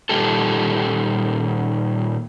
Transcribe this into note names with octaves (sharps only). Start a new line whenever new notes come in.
A#2 D#3 E3 G3 G4 A4